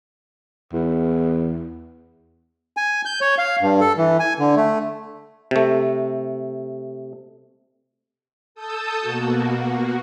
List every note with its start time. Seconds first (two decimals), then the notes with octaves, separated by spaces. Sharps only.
0.73 E2
2.77 G#5
3.05 G6
3.21 C#5
3.38 F5
3.61 G2
3.81 A4
3.98 E3
4.20 G#5
4.39 D3
4.56 A3
5.51 C3 A3
8.55 A4 A5 D#6 E6 G6
9.00 B2 A#3 F#4